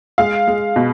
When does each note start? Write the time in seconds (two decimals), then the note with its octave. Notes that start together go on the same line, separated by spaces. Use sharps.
0.18 G#3 F5
0.48 G#3
0.76 B2